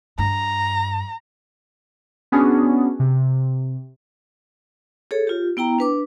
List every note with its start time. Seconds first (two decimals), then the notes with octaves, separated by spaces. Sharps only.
0.18 G2 D4 A#5
2.32 B3 C#4 D4 F#4 G#4
2.99 C3
5.11 G#4 A4 C#5
5.27 F4 G4
5.57 B3 E4 G5 A#5
5.79 D4 B4 D6